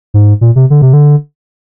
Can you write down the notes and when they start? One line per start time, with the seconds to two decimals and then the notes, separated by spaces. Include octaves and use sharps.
0.14 G#2
0.41 A#2
0.56 C3
0.70 D3
0.82 C3
0.93 D3